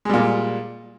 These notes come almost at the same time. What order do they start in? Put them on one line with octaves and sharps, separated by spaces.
G#3 G3 A#2